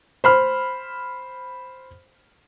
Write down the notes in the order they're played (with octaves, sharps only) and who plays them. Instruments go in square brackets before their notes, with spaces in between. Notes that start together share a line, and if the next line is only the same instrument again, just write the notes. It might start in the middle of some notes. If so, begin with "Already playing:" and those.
[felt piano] C5 B5 F6